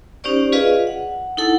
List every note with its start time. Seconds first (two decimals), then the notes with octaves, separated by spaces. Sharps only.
0.24 C#4 D#4 G4 C5 D5 C#6
0.52 F4 G#4 B4 D5 D#5 F5
0.87 F#5
1.37 D#4 E4 A4 F#5 A5